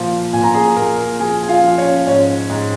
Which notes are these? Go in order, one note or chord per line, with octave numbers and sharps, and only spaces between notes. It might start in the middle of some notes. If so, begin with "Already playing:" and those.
Already playing: A#2 F3
A#2 G#5
A#5
G#4 G#5
A#2 A#4 A#5
F3 G#4 G#5
G#5
F4 F5
F3
C#4 C#5
G#2 C#4 C#5
G#2